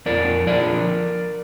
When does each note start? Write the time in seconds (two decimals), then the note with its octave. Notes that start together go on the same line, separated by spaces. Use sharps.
0.06 F2 A#4 D5
0.47 D3 F3 A#4 D5